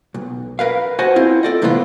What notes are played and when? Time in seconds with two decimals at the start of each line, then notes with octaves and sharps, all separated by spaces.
0.14 B1
0.59 A#4 B4 F5
0.99 F#4 C5 D#5 F#5 G#5 A5
1.16 C4 E4 F4
1.43 A4 D5 D#5
1.62 C2 A2 C3 E3 B3 F4